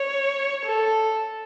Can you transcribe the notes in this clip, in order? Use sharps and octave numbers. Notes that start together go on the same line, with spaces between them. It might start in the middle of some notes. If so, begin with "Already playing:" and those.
Already playing: C#5
A4